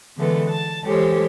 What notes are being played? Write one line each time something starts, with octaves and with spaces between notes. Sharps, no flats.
D3 E3 G#3 A3 B3
A5
E3 G#3 G4 A4 C5 C#5